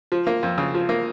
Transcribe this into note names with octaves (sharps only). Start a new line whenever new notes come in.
F3
A#3
F2
C#3
F3
A#3